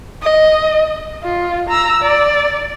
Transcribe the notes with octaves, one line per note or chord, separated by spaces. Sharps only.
D#5
F4
A#5 E6
D5